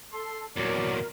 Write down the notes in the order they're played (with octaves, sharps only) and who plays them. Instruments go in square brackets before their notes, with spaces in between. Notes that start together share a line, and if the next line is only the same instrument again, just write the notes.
[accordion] A4 [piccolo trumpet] C6
[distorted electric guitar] E2 A#2 [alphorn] F#3 [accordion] A#4 [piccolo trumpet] D5